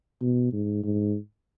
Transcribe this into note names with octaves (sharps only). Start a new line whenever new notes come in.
B2
G#2
G#2